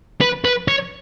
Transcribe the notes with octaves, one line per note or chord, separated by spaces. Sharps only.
B4
B4
C#5